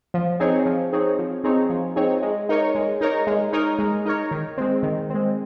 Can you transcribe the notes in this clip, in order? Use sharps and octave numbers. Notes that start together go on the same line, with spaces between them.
F3
C4 D#4 G#4 C#5
F3
C4 D#4 G#4 C#5
F3
C4 D#4 G#4 C#5
F3
C4 D#4 G#4 C#5
G#3
D#4 A#4 C#5
G#3
D#4 A#4 C#5
G#3
D#4 A#4 C#5
G#3
D#4 A#4 C#5
D#3
G#3 C4
D#3
G#3 C4